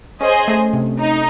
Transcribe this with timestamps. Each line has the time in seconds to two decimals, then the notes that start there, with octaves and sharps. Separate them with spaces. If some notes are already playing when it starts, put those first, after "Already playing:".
0.21 C#4 G#4 C5 D#5 G#5
0.48 A3
0.73 C3
0.99 D#4